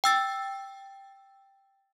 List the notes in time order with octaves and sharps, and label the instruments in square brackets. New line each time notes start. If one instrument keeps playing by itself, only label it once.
[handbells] G5 E6 A6